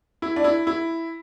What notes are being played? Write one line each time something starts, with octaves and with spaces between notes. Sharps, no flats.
E4
D4
E4
E4